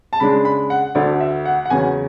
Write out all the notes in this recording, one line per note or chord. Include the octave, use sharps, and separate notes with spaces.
A5
C#3 G#3 D4 B5
B5
F#5
D2 D3 A3 D5
E5
F#5
F#5
E2 C#3 F#3 C#4 G#5